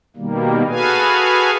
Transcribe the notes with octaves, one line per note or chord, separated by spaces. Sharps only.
B2 D#3 G3 A#3
F#4 G#4 A4 B4 F5 G#5